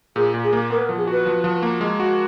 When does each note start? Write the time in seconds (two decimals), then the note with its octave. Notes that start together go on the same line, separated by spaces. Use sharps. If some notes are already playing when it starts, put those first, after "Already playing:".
0.16 A#2 G#4
0.34 A#2
0.44 G#4
0.53 A#3
0.70 B3 A#4
0.78 B4
0.84 A#4
0.89 F3
0.98 G#4
1.08 F#4 B4
1.26 F3
1.44 F3
1.62 A#3
1.81 G#3
2.00 F#4